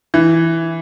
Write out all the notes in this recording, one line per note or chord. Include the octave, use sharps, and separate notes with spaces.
E3